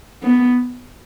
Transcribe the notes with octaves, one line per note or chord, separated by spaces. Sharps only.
B3